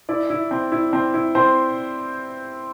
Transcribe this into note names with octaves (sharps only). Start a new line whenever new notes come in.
E4 D5
E4
C4
E4
C4
E4
C4 C5